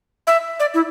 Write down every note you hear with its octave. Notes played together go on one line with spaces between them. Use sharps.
E5
D5
E4